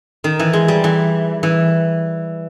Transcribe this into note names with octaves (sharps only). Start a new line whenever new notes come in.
D#3
E3
G#3
G3
E3
E3